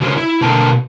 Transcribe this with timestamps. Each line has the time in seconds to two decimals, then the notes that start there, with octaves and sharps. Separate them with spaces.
0.01 C#3 F#4 A#4 C5 C#5
0.17 E4
0.41 B2 D3 A#3 A#4 G5 A5